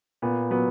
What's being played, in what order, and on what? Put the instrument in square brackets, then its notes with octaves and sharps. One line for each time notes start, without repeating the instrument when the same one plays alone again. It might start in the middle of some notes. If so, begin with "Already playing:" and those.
[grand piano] A#2 B3
F#3 B3